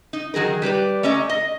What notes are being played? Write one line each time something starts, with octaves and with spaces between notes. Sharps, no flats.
D#4
D#3 F#3 G#4 A#4
G3 G4 B4 D5
A3 C#4 D5 D#5 A#5
D#5